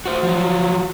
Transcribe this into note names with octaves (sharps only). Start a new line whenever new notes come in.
F#4 C5
F3 F#3